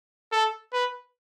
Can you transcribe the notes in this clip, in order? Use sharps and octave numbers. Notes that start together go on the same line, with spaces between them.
A4
B4